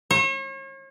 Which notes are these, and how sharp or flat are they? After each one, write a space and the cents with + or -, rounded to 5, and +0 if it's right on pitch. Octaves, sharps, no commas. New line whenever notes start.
C#5 -40